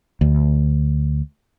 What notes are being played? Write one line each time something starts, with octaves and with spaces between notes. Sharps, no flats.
D2